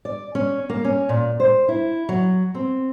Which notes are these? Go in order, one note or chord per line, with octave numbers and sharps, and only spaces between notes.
D5
C#4
A#3
C#4
A#2
C5
E4
F#3
C4